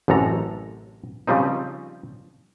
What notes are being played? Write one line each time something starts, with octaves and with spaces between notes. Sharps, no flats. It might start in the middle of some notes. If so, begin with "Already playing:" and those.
A1 F#2 C3 A4 A#5
C#3 F3 G3 C4 D#4